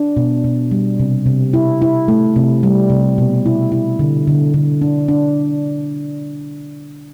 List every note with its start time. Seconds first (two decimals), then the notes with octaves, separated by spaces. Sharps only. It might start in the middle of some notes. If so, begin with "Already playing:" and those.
Already playing: D4
0.17 B2
0.44 B2
0.71 G3
1.00 C3
1.26 C3
1.53 E4
1.82 E4
2.08 A3
2.36 C3
2.63 G3
2.90 C3
3.18 B2
3.46 E4
3.72 E4
3.99 D3
4.27 D3
4.54 D3
4.82 D4
5.08 D4